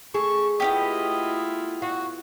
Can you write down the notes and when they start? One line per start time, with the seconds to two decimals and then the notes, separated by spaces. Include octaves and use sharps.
0.14 A3 G#4 C#6
0.60 B3 C#4 E4 F4 G4 D#5
1.82 F#4 F5